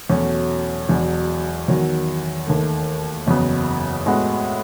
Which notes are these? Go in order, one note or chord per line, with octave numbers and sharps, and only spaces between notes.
E2 B2 F#3 A3 C#4
E1 E2 B2 F#3
E2 D#3 F#3
D#2 D#3 A3
F#1 E2 C#3 F#3 B3
A2 G#3 B3 F#4